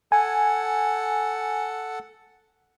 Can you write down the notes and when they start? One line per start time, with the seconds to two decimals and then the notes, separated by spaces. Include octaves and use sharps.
0.12 A4 F#5 G#5